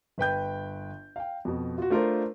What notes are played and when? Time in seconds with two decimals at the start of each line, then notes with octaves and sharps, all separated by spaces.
0.18 G1 B4 G5 G6
1.16 F5 G5
1.45 F2 B2
1.78 F4 F#4
1.90 A3 D4 F4 A#4 C5